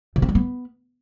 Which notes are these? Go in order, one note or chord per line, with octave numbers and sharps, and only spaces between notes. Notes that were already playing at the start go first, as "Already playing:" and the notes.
C3
C4
G3
B3